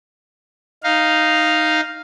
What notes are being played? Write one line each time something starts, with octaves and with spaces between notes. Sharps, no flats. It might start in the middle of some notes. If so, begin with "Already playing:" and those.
D#4 F5